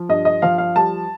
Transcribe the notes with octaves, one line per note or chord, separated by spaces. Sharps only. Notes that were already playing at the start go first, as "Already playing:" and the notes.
Already playing: F3
G2 D#5
D#5
F3 F5
F5
G3 A5